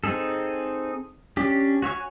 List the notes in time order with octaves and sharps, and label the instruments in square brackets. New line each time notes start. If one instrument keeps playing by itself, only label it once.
[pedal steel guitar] C4 D#4 G#4 A4
C#4 D4 G4
F#4 C#5 E5 G#5